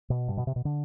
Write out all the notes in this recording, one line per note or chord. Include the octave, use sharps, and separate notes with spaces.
B2
G2
B2
C3
B2
D3